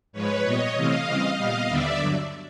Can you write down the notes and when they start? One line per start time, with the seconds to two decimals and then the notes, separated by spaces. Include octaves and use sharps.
0.12 G#2 F3 G#3 B4 C#5
0.43 A#2 G3 B3 C#5 D#5
0.74 C3 E3 A3 C4 D#5 F5
1.05 C#3 E3 G3 C4
1.36 A#2 G3 B3 D#5 F5
1.67 D#2 D3 G3 B3 D5 E5
1.97 G2 D3 F#3